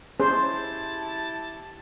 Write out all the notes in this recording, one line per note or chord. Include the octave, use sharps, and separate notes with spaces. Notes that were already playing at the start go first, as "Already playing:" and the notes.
C#4 E4 G4 G#4 C5 A5